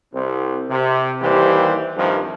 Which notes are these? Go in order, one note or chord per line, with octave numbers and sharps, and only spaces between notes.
C2 C4
C3
D#2 E3 G3 G4 C5
C2 G2 C3 D#3 F3